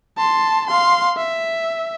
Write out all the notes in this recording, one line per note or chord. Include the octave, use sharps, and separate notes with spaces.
A5 C6
F5 C6
E5